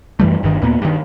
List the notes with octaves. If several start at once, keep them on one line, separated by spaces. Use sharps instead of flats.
F#2 E3 G3 A3
G1 G2 D#3
D#2 A#2 A#3 B3
G2 D#3